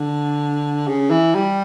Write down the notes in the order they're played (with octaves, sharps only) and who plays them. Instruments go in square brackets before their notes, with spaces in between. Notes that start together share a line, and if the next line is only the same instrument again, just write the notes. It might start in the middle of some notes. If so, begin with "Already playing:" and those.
Already playing: [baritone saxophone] D3
C#3
E3
G3